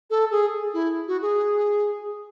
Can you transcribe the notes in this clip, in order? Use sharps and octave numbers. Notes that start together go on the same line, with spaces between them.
A4
G#4
E4
F#4
G#4